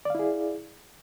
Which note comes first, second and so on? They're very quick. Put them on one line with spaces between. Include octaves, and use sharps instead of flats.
D5 F5 E4 G#4